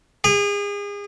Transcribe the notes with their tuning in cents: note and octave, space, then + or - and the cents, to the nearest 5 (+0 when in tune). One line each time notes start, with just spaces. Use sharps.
G#4 -35